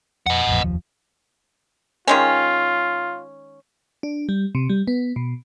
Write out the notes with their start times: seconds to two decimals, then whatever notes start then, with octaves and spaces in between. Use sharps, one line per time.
0.27 F2 D#5 F#5
0.47 A1 F2
0.64 F1 D#2 F3
2.08 D#3 G#3 C#4 F4
4.03 D4
4.29 G3
4.55 C3
4.70 G3
4.87 B3
5.16 B2